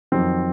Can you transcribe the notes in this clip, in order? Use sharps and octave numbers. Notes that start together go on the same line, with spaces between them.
F2 D#3 F#3 C4